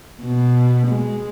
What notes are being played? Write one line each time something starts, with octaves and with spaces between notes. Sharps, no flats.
B2
G#3